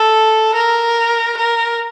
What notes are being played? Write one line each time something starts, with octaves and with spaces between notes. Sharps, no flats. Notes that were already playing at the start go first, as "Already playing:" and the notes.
Already playing: A4
A#4
A#4